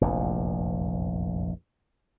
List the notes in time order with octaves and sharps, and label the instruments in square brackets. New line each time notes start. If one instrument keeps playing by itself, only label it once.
[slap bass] F1 A#1 E2